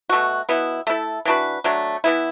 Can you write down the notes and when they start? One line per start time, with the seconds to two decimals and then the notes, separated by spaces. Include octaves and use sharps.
0.09 B2 A3 F#4
0.49 B2 B3 E4
0.87 A3 E4 A4
1.25 E3 D4 F#4 B4
1.64 F#3 A3 D4
2.04 E3 B3 E4